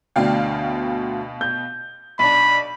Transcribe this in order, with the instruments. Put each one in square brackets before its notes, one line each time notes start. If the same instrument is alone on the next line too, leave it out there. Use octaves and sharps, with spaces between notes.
[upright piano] D2 D4 [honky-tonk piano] B2 F5 G5
[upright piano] G6
[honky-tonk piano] B1 D4 [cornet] B5